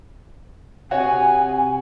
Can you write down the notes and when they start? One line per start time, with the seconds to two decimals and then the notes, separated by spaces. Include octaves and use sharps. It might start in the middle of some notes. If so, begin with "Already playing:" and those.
0.91 C3 F#4 C#5 G#5